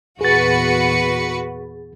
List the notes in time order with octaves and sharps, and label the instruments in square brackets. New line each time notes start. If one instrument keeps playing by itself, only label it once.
[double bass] E2 A#2 [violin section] F#4 B4 C#7 [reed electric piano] G#4 A6